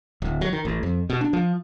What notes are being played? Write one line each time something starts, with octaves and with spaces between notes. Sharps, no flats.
D1
F#3
D#3
A1
F2
B2
D4
F3